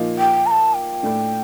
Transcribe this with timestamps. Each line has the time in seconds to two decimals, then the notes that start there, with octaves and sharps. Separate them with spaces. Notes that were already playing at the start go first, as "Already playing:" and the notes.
Already playing: A#2 F3 A#3 D#4
0.18 G5
0.46 A#5
0.51 A5
0.74 G5
1.03 A2 A3 D4